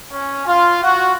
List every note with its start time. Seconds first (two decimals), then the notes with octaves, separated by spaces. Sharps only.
0.12 C#4
0.47 F4
0.83 F#4